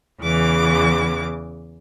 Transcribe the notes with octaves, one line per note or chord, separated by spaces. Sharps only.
E2 C#3 E3 D6